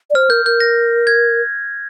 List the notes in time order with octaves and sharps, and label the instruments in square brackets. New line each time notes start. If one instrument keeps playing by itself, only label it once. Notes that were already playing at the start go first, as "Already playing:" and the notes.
[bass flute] D5
[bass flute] C5 [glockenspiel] F6
[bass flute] A#4 [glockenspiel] G6
[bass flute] A#4 [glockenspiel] G6
[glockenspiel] A#6
G#6